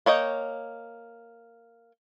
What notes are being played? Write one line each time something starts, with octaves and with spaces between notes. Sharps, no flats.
A#3 C#5 D#5 G5